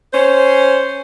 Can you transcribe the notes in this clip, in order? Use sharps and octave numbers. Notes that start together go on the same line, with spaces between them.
C#4 C5